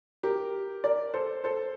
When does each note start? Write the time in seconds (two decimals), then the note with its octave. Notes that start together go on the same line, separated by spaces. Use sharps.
0.23 G4 A#4
0.84 A#4 D5
1.14 A4 C5
1.44 A4 C5